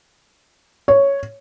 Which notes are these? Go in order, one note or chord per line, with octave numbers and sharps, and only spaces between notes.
C#5